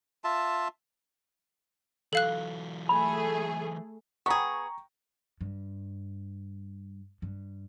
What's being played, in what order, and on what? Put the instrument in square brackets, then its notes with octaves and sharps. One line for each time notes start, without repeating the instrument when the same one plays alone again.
[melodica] F4 E5 A5
[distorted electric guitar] E3 F#3 [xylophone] A4 F5 F#6
[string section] A3 G#4 [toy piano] B5
[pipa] B3 G#4 [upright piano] G5 A#5 C#6
[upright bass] G2
G2